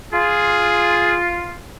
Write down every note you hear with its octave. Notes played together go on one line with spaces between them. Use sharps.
F4 G#4